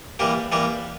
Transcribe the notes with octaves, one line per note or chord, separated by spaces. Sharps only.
E3 G3 A#3 G4
E3 G3 A#3 G4